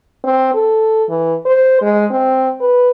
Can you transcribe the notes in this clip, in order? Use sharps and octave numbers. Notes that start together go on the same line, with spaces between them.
C4
A4
E3
C5
G#3
C4
B4